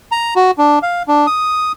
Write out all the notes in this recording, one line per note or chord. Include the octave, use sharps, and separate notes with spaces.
A#5
F#4
D4
F5
D4
D#6